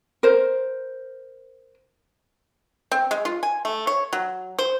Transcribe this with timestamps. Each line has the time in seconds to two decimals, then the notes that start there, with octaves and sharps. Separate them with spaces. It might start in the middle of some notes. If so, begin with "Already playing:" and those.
0.23 A#4 C5
2.92 C4
3.11 G#3
3.25 F4
3.43 G#5
3.65 A3
3.87 C#5
4.13 F#3
4.59 C5